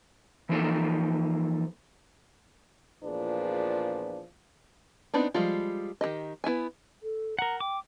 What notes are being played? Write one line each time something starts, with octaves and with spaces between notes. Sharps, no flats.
E3 F3 A#3 D#4 A4 C5
E2 A#2 F3 D4 G#4 B4
B3 C4 D4 D#4 B5
F3 G3 G#3 F4
D#3 F#3 G4 D#5
B3 E4 E5 G#5
A4
A#4 F#5 A#5
G5 D6